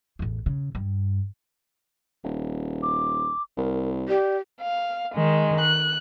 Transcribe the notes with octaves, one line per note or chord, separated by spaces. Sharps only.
A1 E2
C#3
G2
D#1
D6
C2 A#4
G4 D5
F5
D#3 G#3
F#6